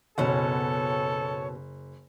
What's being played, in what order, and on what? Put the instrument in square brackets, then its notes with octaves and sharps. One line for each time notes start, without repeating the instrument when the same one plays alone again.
[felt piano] F#1 [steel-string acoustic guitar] B2 C#4 F#5 [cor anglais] A4 [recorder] C#5